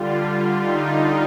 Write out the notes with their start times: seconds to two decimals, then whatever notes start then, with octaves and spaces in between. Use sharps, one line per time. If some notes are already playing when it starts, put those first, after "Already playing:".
Already playing: D3 G3 F4
0.62 D#4